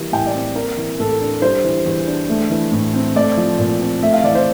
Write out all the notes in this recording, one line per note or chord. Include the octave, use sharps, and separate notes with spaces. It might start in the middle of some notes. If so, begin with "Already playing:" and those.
Already playing: E3 G3 A#3
A2 G5
D5
C4
A#3 A#4
E3
A2 A4
D4
G3 C5
E3
E2
D4
A3
E3
A2
C4
A3 D5
F3
A#2
C4
A3 E5
F5
E3 D5
C5